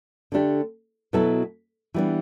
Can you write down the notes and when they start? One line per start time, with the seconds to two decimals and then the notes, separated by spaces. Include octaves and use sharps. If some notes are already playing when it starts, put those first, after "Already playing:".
0.32 D3 A3 D4 G4
1.13 B2 F#3 B3 E4 A4
1.94 E3 G3 B3 D4